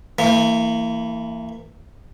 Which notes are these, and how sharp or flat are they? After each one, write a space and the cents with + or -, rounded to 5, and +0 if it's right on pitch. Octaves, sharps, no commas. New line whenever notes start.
E3 +0 A#3 -35